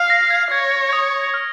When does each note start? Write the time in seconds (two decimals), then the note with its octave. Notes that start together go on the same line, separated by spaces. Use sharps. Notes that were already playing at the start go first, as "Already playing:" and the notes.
Already playing: F5
0.10 A#6
0.30 G#6
0.52 C#5 G#6
0.93 D#6
1.34 F6